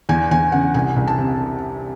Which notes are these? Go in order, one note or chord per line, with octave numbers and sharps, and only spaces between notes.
E2 G#5
E2 G#5
C#3 F#5
C2 G#5
C2
A5
C3